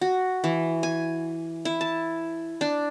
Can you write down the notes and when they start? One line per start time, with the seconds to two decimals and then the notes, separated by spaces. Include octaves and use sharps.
0.01 F#4
0.44 E3
0.83 G#5
1.65 E4
1.81 A5
2.61 D4